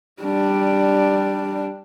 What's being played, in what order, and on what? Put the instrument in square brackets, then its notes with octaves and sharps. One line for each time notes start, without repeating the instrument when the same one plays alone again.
[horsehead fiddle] G3 D4